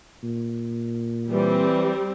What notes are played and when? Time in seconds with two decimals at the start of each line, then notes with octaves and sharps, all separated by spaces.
0.23 A#2
1.28 E3 G3 C4